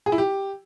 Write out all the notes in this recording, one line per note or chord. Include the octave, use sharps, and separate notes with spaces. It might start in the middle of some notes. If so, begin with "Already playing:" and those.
G#4
E4
G4